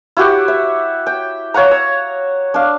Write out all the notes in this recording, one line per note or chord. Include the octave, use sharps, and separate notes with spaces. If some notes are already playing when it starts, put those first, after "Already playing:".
E4 F#4 G4 F#5
E5
G5
C#5 F5 F#5 A#5
E6
D4 F5